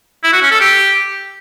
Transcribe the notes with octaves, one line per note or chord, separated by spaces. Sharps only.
E4
F#4
C#4
A4
G4